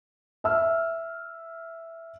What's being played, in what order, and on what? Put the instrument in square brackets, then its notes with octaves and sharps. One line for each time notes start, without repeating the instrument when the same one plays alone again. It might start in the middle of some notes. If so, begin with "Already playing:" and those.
[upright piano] E5 E6 F6